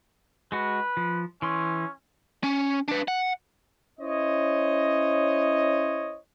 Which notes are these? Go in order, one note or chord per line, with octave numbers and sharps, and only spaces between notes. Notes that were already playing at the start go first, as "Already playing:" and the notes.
G#3 F#4 B4
F3
E3 C#4 C6
C#4
D4 B4
F#5
C#4 E4 C5 C#5 D#5